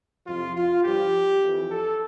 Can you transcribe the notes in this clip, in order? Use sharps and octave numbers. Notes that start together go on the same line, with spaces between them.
F2 C3 F3 F4
F4
G2 F3 G4
F2 E3
A4